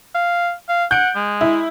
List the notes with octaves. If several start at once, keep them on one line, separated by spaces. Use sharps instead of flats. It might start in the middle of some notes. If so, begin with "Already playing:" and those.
F5
F5
F#5 G6 D7
G#3
E4